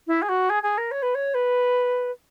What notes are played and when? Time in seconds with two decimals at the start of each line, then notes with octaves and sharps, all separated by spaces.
0.07 E4
0.22 G#4
0.28 F#4
0.49 G#4
0.63 G#4
0.77 A#4
0.91 C#5
1.02 B4
1.14 C#5
1.34 B4